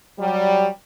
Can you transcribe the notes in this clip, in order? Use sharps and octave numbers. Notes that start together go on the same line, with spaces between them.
F#3 G3